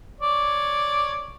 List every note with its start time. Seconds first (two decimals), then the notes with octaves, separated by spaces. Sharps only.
0.21 C#5 D5